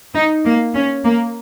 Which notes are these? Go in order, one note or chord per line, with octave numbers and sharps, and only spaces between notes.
D#4
A#3
C#4
A#3